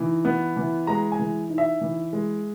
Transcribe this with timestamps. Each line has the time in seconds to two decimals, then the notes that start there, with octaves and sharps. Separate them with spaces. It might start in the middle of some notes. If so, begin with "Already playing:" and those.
Already playing: E3 D#4
0.25 B3
0.57 E3
0.87 G#3 A#5
1.12 G#5
1.19 E3
1.50 D#4
1.58 E5
1.81 E3
2.13 G#3